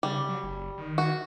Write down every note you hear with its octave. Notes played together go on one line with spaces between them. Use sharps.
C#3 G3
F#3
F#1
D#3
F#4